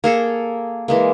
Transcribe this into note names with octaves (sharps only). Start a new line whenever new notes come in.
A#3 G#4 A4
E3 G#3 A#3